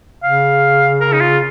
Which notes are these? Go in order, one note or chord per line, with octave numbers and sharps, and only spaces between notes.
C#3 F5
A#4
D#4
F4